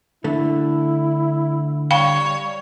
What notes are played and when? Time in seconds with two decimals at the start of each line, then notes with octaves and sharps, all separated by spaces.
0.24 D3 A3 E4
1.91 G3 C#5 F5 G5 B5